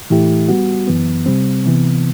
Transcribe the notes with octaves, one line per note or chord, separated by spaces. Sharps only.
A2 E3 A3 E4 G4
G3 B3 F#4
F#2 E3 B3
C3 G3 C4
C3 E3 B3